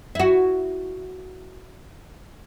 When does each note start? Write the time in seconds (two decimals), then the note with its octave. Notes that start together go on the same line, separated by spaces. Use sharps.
0.15 E4 F#4